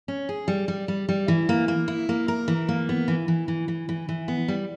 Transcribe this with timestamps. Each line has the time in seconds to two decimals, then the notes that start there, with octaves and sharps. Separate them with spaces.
0.08 C#4
0.29 G#4
0.48 G3
0.68 G3
0.88 G3
1.09 G3
1.28 E3
1.49 A#3
1.68 A#3
1.88 E4
2.09 A#3
2.28 A#4
2.48 E3
2.69 A#3
2.89 B3
3.08 E3
3.28 E3
3.48 E3
3.68 E3
3.89 E3
4.09 E3
4.28 B3
4.48 G3